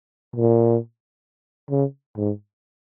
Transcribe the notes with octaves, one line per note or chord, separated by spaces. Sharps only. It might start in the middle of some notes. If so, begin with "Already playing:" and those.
A#2
C#3
G#2